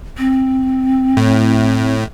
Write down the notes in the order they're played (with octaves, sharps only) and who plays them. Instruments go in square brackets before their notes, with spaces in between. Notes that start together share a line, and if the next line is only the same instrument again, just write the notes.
[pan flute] C4
[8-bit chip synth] A2